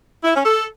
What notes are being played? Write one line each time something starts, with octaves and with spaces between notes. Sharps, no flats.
E4
C#4
A4